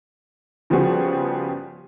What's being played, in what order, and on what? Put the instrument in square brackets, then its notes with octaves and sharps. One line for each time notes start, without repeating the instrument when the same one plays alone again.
[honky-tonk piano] C#3 F3 G3 B3 F#4 G#4